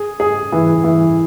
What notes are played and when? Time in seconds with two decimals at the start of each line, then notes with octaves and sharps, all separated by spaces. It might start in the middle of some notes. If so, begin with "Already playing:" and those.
Already playing: G#4
0.20 G#4
0.52 E3
0.84 E3